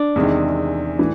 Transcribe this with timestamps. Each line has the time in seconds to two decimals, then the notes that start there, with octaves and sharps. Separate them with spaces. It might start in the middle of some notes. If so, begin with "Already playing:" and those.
Already playing: D4
0.16 E2 C3 D#3 G#3
0.99 A2 E3